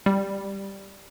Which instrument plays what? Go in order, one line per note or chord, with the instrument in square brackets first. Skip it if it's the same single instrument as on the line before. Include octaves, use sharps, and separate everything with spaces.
[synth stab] G3